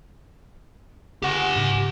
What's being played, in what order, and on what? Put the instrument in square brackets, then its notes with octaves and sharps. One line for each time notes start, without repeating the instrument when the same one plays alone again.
[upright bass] D3 [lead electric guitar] G4 F#5
[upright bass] G#2 C#3
F4